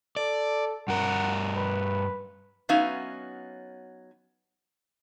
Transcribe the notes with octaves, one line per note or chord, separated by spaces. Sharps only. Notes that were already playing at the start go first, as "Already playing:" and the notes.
A4 D5
G2 A#4 F#5
B4
F#3 B3 C#4 D#4 E5 F5